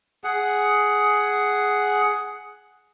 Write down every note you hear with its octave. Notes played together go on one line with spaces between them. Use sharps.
G#4 F#5